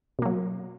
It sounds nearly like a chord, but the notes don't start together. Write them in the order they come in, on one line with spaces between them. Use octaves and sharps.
B2 A#3 F#3